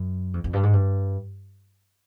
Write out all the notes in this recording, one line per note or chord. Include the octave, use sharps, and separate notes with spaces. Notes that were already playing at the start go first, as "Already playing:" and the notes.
Already playing: F#2
F2
F2
G2
G#2
G2